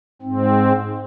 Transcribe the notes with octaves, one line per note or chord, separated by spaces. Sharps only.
G#2 C4